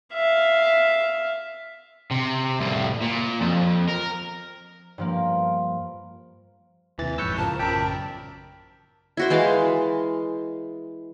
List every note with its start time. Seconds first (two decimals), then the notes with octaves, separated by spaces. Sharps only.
0.14 E5 F5
2.11 C3
2.60 C2 A2
3.02 A#2
3.41 F2
3.88 A#4
4.98 G2 F3 A#3
6.99 D#2 C3 E3 A6
7.18 A1 F2 G#2 B4 C#5 E6 G6 C#7
7.38 C#2 F3 A#4 A5
7.59 A1 F#2 C#3 A#4 D5 E5 G5 B5
9.17 E4 F#4 C5
9.30 E3 G#3 F5 A5